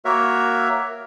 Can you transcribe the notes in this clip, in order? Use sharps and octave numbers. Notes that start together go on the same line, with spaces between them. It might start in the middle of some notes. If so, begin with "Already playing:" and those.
A#3 F#4 A#4 C#5 E5